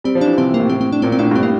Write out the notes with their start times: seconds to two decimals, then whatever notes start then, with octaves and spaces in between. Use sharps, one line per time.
0.04 G3 C4
0.15 F3
0.21 D4
0.26 E3
0.37 C3 C4
0.54 A#3
0.60 A2
0.70 C4
0.81 C4
0.92 D4
1.02 A#2 C4
1.12 C4
1.19 A2 D4
1.31 G2 C4
1.43 A2 A#3